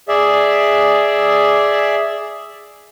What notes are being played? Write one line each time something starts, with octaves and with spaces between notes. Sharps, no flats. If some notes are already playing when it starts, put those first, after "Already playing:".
G#4 D5 E5